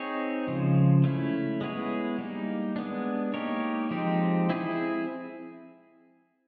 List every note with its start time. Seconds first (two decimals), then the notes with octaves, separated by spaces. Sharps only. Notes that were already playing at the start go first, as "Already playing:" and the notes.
Already playing: C4 D#4 G#4 C#5
0.47 C#3 F3 G#3
1.04 A3 C#4 E4
1.61 G#3 B3 E4 G#4 C#5
2.18 G3 A#3 D#4
2.76 G#3 B3 D4
3.34 A#3 D#4 G4 A#4 C#5
3.91 F3 G#3 C4 D#4 G4
4.50 C4 E4 G#4